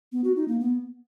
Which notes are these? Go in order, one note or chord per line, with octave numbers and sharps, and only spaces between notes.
B3
F#4
D#4
A#3
B3